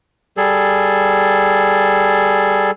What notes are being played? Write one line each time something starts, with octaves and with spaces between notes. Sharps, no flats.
G3 G#4 A4